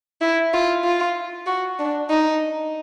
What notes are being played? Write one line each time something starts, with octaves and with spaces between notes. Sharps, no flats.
E4
F4
F4
F#4
D4
D#4